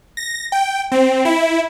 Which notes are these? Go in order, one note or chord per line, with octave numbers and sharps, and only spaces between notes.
A#6
G5
C4
E4